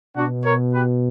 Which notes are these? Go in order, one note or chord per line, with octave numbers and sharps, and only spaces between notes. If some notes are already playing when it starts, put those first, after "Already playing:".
B2 D4 F#4
A#4 C#5
G4 B4